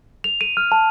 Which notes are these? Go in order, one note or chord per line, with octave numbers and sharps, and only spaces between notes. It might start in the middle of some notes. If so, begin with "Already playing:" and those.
F7
D#7
F6
A5